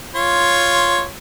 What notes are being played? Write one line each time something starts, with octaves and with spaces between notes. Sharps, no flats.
F4 C#5 C6